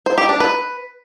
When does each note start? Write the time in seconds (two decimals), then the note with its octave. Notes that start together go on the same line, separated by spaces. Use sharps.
0.06 C5
0.18 G4
0.29 D4
0.40 B4